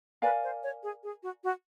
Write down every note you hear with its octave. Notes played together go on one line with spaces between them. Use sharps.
A#4 B4 D5 F5 G#5
C5
C#5
G#4
G#4
F#4
F#4